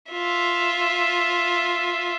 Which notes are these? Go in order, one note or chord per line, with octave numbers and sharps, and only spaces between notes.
F4 E5